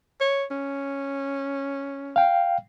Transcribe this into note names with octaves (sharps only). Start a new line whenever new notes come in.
C#5
C#4
F5 G5